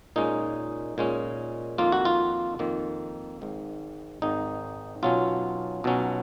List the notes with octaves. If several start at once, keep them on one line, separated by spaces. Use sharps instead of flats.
A#2 G#3 C#4 D#4
A#2 G#3 C#4
F2 D#3 A#3 F4
F#4
F4
F2 D#3 A#3
G#1 G#2 D#3
G#1 G#2 D#3 D#4
B1 B2 F#3 C#4 F4
B1 B2 F#3 C#4